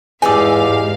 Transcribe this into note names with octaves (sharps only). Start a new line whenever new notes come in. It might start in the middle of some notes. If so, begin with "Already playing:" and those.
E2 G#2 D#4 G4 D5 F5 G#5 E6